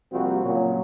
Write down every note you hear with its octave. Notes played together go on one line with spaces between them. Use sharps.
C2 F3 G3 A#3 C4 F#4
A#2 C#3 F#3